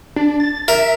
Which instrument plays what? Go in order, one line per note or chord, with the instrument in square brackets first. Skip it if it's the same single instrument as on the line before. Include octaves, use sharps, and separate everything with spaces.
[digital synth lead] D4
A6
[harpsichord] A#4 [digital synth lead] E5